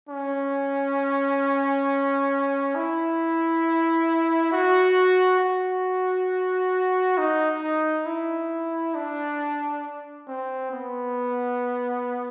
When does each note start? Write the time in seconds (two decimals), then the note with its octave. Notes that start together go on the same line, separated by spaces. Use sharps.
0.09 C#4
2.75 E4
4.52 F#4
5.40 F#4
7.18 D#4
7.62 D#4
8.06 E4
8.95 D4
10.28 C4
10.72 B3